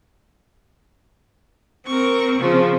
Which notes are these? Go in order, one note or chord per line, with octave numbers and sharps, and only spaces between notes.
C4 A#4 C#6
C#3 F3